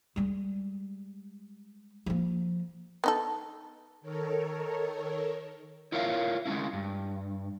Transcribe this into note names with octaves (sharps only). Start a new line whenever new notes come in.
G3 G#3
F3 A#3
B3 D#4 A4
D#3 A4 A#4 C#5
E4 F4 A#4 C#5 E5 F5
G#3 A3 C#4 E4
G2